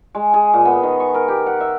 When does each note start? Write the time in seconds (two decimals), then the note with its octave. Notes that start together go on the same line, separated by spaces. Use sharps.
0.15 G#3
0.34 G#4
0.54 A#2
0.65 B3
0.83 D#3
1.00 C#6
1.14 A#4
1.28 G4
1.47 F#5
1.60 E5